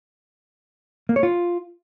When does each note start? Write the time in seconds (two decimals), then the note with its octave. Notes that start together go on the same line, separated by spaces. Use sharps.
1.09 A#3
1.16 C#5
1.23 F4